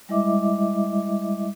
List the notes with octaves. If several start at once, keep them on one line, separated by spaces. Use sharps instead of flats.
G3 G#3 E4 D#5 E5 D6